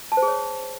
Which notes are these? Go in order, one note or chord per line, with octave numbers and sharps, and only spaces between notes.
A5
C5
G#4
C#5